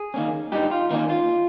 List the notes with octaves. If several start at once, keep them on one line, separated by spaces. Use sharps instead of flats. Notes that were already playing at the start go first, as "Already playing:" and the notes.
Already playing: G#4
D#3 A#3 C#4
G2 D#4 G4
F4
D#3 A#3 C#4 D#4
F4